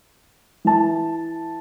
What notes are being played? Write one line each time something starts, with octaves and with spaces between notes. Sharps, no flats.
E3 A5